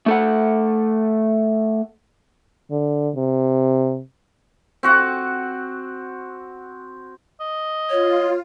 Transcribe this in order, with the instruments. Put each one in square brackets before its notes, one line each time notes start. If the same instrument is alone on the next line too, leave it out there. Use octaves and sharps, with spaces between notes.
[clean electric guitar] A3 A4 F#5
[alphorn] D3
C3
[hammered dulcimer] C4 F#4 F#5
[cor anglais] D#5
[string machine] F4 [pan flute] C#5